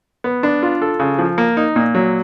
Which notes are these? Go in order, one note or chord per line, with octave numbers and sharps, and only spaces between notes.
B3
D4
F4
A4
C#3
F3
A#3
D#4
A#2
F#3